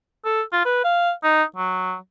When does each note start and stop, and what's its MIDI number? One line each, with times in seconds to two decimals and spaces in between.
0.25 0.42 69
0.53 0.60 65
0.65 0.82 71
0.84 1.11 77
1.23 1.43 63
1.56 1.96 54